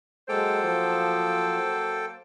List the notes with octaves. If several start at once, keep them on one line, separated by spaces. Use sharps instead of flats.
F#3 G#3 A#3 A4 C5 G5
F3